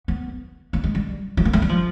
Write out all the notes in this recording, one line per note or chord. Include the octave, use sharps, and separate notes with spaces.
B3
A#3
G#3
G3
F#3
A#3
A3
G3
F3